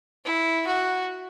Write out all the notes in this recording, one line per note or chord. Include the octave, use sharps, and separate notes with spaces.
E4
F#4